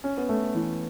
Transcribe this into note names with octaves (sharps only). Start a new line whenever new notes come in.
C#4
B3
A3
E3